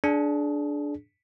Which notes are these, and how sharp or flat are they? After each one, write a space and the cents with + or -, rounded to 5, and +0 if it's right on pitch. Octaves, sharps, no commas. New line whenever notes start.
D4 -5 G#4 +30